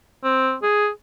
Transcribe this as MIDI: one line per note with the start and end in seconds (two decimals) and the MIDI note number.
0.23 0.54 60
0.62 0.88 68